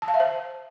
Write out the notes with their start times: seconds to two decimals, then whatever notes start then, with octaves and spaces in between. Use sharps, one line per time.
0.02 A5
0.08 F5
0.14 E5
0.20 C5